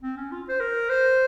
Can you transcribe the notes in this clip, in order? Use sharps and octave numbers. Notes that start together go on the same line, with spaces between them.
C4
C#4
F4
C5
A#4
C5